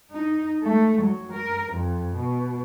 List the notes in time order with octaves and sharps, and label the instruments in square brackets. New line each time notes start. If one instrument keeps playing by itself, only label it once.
[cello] D#4
A3
F#3
A#4
F2
B2